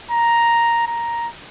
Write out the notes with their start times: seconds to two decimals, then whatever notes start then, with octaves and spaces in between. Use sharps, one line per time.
0.11 A#5
0.88 A#5